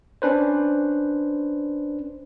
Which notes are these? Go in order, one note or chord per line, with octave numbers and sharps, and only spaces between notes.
C#4 D4 B4 C5